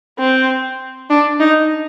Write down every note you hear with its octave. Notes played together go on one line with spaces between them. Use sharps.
C4
D4
D#4